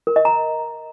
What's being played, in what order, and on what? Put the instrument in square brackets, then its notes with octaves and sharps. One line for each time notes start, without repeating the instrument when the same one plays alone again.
[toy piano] A#4
D#5
A#5